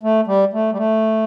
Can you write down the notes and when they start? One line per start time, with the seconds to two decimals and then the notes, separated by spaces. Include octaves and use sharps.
0.03 A3
0.27 G3
0.53 A3
0.72 G3
0.77 A3